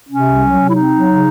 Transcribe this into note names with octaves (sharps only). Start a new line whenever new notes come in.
C3 C#4
C2
F#3
C3
E4
C4 D#4
F#3
C#3